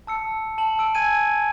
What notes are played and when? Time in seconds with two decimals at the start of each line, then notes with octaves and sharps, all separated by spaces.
0.07 A5 E6 C#7
0.58 A5 F#7
0.79 E6 D7
0.95 G#5 G#6 D#7